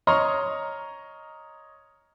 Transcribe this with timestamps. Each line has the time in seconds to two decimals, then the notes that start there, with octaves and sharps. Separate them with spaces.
0.07 C#5 D#5 A#5 C6 F6